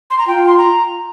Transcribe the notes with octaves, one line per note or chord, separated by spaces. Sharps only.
C6
A#5
F4 G5
C6
A#5